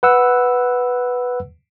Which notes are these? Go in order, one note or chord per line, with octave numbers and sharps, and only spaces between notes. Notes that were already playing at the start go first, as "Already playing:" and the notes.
B4 F#5 E6